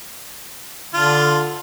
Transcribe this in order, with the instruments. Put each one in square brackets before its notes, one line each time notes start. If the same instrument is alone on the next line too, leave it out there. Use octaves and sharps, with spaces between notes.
[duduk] D3 [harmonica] D4 F4